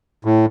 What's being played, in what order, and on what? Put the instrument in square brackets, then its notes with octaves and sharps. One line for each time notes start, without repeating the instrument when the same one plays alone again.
[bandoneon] A2